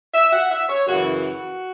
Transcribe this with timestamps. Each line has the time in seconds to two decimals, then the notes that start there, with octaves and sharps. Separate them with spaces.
0.14 E5
0.32 F#5
0.50 E5
0.68 C#5
0.86 F#2 C#3 E3 F#4
1.22 F#4